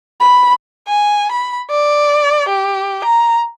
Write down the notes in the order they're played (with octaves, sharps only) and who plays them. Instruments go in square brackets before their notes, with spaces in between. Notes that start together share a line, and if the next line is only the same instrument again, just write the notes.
[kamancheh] B5
[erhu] G#5
B5
D5
G4
A#5